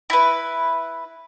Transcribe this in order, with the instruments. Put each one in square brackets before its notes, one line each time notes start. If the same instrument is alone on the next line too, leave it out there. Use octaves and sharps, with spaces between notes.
[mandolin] E4 B4